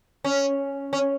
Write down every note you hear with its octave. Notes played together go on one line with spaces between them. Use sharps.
C#4
C#4